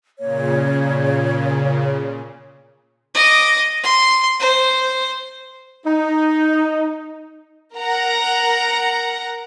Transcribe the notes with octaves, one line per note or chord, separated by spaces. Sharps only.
A#2 C#3 C#5
D#5 D6
C6
C5
D#4
A#4 F#5 A#5